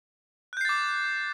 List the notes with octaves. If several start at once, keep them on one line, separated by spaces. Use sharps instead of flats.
D6 F#6 G6 A6 C7